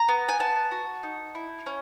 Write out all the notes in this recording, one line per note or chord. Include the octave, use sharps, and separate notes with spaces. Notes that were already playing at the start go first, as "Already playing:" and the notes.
Already playing: A#5
B3
G#5
B3 A5
F#4
D#4
E4
C#4